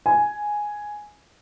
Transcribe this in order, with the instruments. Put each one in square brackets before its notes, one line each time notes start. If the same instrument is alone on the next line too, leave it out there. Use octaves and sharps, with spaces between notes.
[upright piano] G#5